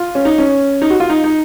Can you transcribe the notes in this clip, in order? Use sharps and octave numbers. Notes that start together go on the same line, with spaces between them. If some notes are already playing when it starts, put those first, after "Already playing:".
Already playing: F4
C#4
D#4
C#4
D#4
F#4
F4
D#4
D#4